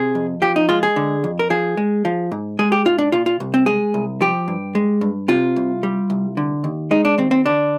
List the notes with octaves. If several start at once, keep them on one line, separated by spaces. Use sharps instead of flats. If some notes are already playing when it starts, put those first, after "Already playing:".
Already playing: C3 G#4
F2
F3 G4
D#4
G#3 F4
G#4
D3
F2
A#4
F3 G#4
G#3
F3
G#2
G#3 G#4
G4
G#2 F4
D4
A#2 F4
F4
C2
C4
G#3 G#4
C2
F3 G4
G2
G#3
G2
C3 F4
C2
G3
C2
D3
D#2
G#3 D#4
D4
D#2 C4
C4
D3 D4